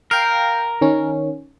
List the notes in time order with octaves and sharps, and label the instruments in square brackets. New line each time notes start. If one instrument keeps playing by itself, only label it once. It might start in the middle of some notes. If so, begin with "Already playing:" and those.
[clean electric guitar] A#4 [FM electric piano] F5 G5
[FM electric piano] D#3 C#4